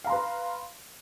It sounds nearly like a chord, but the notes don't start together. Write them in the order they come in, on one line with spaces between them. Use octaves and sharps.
F5 A#5 C6 B4